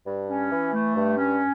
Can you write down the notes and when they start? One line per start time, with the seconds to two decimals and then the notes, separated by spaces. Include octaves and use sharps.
0.06 G2
0.30 C#4
0.52 E3
0.73 A3
0.96 G2
1.17 C#4